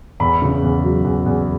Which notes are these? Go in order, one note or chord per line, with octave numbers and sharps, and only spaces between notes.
E2 B5
C#3
E2
F#3
E2
E2